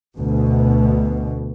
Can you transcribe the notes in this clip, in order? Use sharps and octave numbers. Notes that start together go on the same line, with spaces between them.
D2 B2